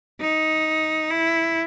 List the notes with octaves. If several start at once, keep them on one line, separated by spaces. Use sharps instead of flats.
D#4
E4